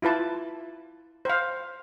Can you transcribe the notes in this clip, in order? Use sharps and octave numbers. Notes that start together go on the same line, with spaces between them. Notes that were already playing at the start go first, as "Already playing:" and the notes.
E4 F4 B4 A5
C5 F5